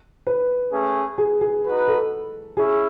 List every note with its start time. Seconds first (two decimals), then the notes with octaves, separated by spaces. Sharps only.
0.27 B4
0.72 A3 C#4 G#4
1.18 G#4
1.41 G#4
1.65 D#4 F#4 B4
1.88 A4
2.57 C#4 E4 G#4